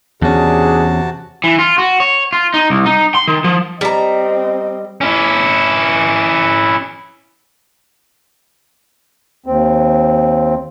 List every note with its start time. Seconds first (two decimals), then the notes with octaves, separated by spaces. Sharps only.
0.22 E2 C3 C#4 D4 F#4 G#4 A5
1.44 E3
1.59 F4
1.78 F#4
2.00 C#5
2.33 F4
2.54 D#4
2.70 C2
2.86 D#4
3.15 C6
3.28 D#3
3.44 F3
3.81 G3 C4 D#5 A#5
5.01 C#4 E4
9.46 D#2 C4